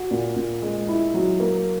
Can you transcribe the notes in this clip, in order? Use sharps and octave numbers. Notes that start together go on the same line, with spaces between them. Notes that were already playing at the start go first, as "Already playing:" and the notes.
Already playing: F#4
A#2
A#2
G#3
E4
F#3
A#3